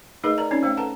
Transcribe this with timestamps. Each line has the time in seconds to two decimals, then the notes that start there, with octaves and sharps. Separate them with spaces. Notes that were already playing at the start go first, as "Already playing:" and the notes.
0.24 A3 D#4 G#4 A#4 B4 D#5
0.38 A#4 D5 A#5
0.51 C4 C#4 D#4 C#5 D5
0.63 A3 C5 F5 G5
0.77 A4 B4 F#5 A5 A#5